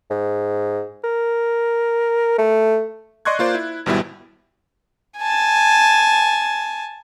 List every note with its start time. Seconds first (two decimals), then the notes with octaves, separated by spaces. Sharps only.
0.10 G#2
1.04 A#4
2.38 A3
3.25 D5 D#5 C6 C#6 F#6 G#6
3.39 A#3 F4 C5 D5
3.55 E4
3.86 G#1 B2 G3 E4
5.19 G#5 A5